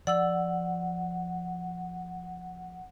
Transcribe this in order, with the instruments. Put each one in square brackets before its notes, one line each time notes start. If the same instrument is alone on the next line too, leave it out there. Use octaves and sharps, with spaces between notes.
[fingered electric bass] F3 [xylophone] D5 E6 F#7 [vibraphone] F#5